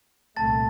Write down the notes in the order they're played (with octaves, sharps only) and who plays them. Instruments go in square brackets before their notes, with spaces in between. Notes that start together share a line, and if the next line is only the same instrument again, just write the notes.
[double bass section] C2 A#2 A3 [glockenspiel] A5 A6